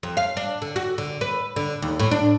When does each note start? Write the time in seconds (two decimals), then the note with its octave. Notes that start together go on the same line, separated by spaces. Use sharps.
0.03 F2
0.17 F5
0.37 D4
0.62 D3
0.76 F#4
0.98 D3
1.21 B4
1.56 D3
1.82 D#2
2.00 A2
2.11 D4